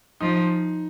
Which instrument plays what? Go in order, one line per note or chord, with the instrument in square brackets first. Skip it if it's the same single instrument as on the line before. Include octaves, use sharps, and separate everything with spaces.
[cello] F3 [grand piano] D#4